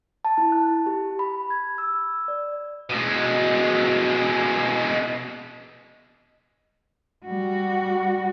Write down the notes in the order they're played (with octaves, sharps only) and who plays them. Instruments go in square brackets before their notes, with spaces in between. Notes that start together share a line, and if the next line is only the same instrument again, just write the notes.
[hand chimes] A5
E4
F#6
G4
B5
G#6
E6
D5
[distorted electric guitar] B2 G#3
[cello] G3 F#4